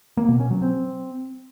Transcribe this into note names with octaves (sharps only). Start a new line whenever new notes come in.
A#3
B2
C#4
F#3
C4